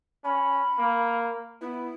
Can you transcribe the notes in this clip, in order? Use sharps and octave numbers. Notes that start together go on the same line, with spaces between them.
C#4 B5
A#3
B3 E4